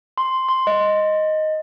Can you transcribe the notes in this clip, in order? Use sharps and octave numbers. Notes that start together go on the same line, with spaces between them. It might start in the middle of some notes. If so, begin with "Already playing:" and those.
C6
C6
D#5